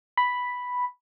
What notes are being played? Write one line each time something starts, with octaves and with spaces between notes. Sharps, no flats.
B5